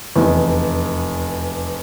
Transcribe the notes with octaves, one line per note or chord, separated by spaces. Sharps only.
F1 E2